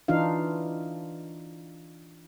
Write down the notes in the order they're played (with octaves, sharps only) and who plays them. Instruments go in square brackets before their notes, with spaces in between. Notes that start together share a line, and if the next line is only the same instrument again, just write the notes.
[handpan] E3 D4 D#4 F4 F5